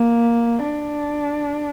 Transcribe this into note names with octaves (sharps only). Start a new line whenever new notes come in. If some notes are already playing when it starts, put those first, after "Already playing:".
Already playing: A#3
D4